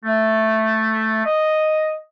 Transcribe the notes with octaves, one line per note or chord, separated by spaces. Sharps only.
A3
D#5